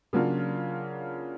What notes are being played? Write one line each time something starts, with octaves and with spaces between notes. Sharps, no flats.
C#3 F#3 A#3 D4 F4